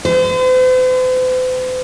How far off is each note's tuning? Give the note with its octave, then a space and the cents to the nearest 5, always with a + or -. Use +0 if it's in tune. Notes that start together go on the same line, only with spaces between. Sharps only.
C5 -45